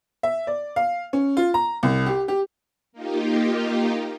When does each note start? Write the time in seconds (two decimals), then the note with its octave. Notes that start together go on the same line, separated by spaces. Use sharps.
0.23 E5
0.47 D5
0.76 F5
1.13 C#4
1.37 F4
1.54 A#5
1.83 C2
2.06 G4
2.28 G4
2.92 A#3 D#4 F4 G4